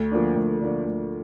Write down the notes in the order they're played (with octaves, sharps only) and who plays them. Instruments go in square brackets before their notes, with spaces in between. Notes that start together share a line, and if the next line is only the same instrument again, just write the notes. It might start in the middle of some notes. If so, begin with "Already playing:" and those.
Already playing: [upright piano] D2
D3 F3 A#3 D4
D2
D3 F3 A#3 D4
D2